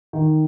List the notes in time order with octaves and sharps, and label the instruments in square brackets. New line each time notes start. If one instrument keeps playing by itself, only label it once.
[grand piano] D#3